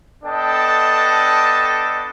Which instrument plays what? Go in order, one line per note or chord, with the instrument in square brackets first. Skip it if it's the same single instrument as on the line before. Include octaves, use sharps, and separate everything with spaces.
[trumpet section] B3 D4 A4 D#5 G5 A5